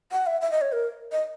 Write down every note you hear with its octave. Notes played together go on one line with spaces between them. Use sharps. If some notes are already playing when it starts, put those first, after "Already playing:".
F#5
E5
E5
D#5
C#5
A#4
D#5